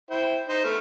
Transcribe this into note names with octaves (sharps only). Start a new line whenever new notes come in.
E4 C5 G5
D#4 C5
A3 B3 F6